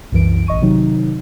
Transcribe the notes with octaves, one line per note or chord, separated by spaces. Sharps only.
C2 F#2 E3 D7
A1 D#5 C#6 D#7
C3 D#3 F#3 D#4